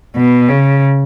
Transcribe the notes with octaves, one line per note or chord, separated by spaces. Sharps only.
B2
C#3